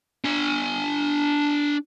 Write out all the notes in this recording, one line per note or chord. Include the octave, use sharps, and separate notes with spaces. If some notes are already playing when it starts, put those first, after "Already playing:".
D4 G#5